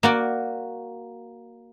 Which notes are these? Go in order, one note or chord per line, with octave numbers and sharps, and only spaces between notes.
A#3 F#4 D5